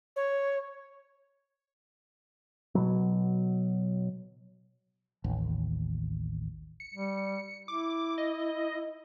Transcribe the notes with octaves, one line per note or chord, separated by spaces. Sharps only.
C#5
B2 F#3
A1 D#2
C#7
G3
E4 D6
D#5